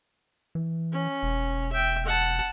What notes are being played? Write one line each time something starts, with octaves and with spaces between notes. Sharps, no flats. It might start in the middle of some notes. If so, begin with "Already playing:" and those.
E3
C#4
E1
E5 G5
F#5 A5